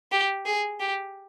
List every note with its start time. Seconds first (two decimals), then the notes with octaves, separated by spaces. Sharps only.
0.12 G4
0.45 G#4
0.80 G4